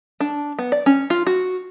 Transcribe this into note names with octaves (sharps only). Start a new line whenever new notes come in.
D4
B3
D5
C#4
F4
F#4